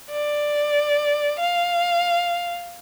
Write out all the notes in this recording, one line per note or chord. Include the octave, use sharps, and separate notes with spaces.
D5
F5